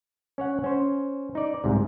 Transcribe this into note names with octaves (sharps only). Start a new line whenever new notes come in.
C#4 C#5 F#5
C#4 C5
D#4 D5
C2 G#2 C3